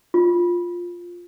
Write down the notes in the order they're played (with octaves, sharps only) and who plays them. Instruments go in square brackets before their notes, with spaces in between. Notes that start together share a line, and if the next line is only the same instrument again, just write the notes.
[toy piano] F4